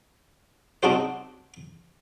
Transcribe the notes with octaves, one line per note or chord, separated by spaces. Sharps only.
C4 D4 D#4 F#4 G4 C5